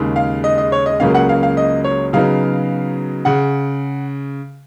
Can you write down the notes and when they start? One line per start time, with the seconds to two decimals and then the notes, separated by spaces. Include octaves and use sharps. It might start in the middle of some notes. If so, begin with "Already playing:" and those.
Already playing: D#2 C#3 G#3
0.16 F5
0.44 D#5
0.58 D#5
0.72 C#5
0.86 D#5
1.00 C#2 C#3 F#3 A#3 C#4 F5
1.14 F#5
1.29 F5
1.43 F5
1.57 D#5
1.84 C#5
2.13 C#3 F#3 B3 D#4 F5
3.25 C#3 F#5